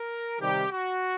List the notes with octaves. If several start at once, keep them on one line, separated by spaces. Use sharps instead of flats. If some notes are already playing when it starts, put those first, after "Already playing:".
Already playing: A#4
C3 D#3 G3 G4
F#4